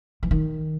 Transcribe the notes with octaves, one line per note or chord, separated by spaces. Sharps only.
E3
D#3